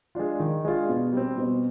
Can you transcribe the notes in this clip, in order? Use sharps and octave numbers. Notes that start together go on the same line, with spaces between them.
G#3 D4 F4
D#3
G#3 D4 F4
B2
G3 C4
B2